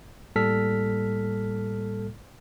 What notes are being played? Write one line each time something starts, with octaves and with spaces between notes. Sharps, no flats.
A2 G3 A#3 A4 F6 B6